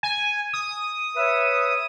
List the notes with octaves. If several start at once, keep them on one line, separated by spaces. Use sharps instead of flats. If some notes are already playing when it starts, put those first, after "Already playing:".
G#5
D#6
B4 C#5 E5